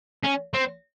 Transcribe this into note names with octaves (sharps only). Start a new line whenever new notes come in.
C#4
C4